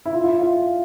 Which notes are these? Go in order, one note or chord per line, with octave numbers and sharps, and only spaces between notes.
E4
F4
F4
E4
F4